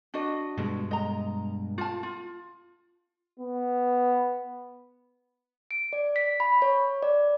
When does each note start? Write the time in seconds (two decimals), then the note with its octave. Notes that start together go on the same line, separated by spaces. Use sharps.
0.14 D4 F#4 D#5
0.58 G2 B2 G#3
0.91 D#5 A#5
1.78 F4 A5
2.03 F4
3.40 B3
5.71 D7
5.93 D5
6.16 B6
6.40 B5
6.62 C#5
7.03 D5